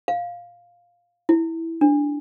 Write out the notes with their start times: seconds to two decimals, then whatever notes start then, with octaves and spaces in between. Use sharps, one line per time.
0.08 F5
1.29 E4
1.81 D4